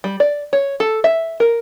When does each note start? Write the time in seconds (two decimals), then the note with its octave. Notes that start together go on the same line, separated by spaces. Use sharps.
0.04 G3
0.20 D5
0.53 C#5
0.80 A4
1.04 E5
1.40 A#4